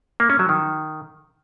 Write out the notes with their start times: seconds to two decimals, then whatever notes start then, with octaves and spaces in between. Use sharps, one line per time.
0.20 A#3
0.30 C#4
0.39 F#3
0.49 D#3